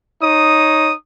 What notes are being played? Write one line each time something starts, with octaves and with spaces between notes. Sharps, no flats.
D#4 C#5 D#6